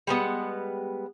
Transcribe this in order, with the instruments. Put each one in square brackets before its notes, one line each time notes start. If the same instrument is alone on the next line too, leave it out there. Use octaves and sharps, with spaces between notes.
[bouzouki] G3 G#3 B3 F#5